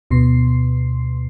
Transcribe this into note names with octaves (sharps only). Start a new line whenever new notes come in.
D2 B2 C6 C7